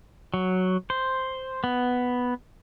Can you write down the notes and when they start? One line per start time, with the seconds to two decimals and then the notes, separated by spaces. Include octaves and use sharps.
0.34 F#3
0.90 C5
1.64 B3